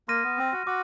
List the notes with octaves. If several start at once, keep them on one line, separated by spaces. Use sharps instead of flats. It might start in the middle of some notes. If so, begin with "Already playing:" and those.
A#3 C6 F6 A#6 D#7
B3
C4
F#4
F#4 D6